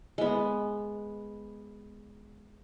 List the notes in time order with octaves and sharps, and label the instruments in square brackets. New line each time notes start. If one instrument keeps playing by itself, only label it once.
[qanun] G#3 B3